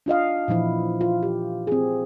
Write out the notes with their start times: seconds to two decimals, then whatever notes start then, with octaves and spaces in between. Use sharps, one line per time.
0.06 D4 F4 D#5 F5
0.48 A#2 E3 F3 E4
1.01 F4
1.23 G4
1.67 C4 G#4